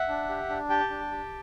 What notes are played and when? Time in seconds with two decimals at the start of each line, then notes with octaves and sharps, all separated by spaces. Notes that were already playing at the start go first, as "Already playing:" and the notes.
Already playing: E5 F#5
0.09 D4
0.29 G4
0.49 D4
0.70 G4 G5 A5
0.90 D4
1.11 G4